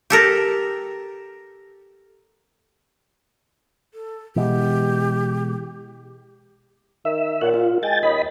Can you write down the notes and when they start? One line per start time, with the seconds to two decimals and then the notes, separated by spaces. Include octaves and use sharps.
0.10 G4 A4 A#4
3.94 A4
4.36 B2 E3 G#3 G4
7.05 D#3 E5
7.41 A#2 C#5 F#5
7.54 F4
7.83 G#3 G5 G#5 A6
8.03 D#2 D#5 B5